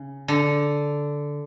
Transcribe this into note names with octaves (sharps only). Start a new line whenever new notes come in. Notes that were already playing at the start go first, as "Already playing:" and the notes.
Already playing: C#3
D3